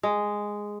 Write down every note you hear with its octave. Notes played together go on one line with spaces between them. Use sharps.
G#3